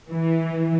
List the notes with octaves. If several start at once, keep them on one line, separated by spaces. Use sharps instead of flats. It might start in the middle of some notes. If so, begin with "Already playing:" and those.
E3